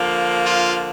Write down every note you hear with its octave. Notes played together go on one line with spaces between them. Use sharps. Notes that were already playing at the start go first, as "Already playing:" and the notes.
Already playing: D3 F3 A#3
F4